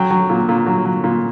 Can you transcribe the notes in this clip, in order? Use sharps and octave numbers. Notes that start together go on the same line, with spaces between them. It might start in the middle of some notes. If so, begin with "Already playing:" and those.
Already playing: F#3 G5
F#3
A#2
A#2
F#3
F#3
A#2